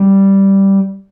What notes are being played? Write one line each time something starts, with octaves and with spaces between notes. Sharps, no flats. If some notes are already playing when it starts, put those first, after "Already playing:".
Already playing: G3